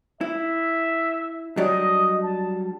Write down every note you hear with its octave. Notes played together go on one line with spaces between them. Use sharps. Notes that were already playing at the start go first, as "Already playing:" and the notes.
E4 E5
F#3 G3 D4 D#5
A5